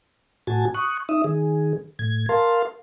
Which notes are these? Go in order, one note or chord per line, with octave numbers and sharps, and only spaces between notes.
A2 F#4 G#5 A5
C#6 D#6 F#6
D#4 E5 D#6
D#3 G#4
A2 G#6
A#4 F5 A5 C6